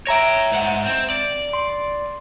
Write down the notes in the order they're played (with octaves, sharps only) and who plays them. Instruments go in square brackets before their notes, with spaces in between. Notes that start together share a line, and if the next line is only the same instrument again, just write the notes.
[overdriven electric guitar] C#5 G5 [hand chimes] E5 A#5 A#6
[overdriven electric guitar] G#2 F#5
C4
D5
[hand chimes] C6